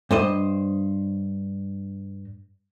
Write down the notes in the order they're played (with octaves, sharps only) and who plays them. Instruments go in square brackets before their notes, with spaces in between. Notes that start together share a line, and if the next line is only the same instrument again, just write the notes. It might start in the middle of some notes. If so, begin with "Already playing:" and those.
[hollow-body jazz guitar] G2 C5 D#5